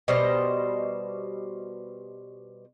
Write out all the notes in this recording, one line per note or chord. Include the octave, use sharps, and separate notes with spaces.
B2 G3 C5 D#5